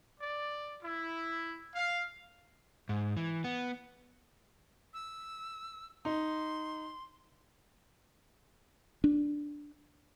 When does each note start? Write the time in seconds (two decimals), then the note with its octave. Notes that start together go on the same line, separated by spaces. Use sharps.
0.20 D5
0.83 E4
1.74 F5
2.89 G#2
3.17 E3
3.44 B3
4.94 E6
6.05 D#4 C6
9.04 D4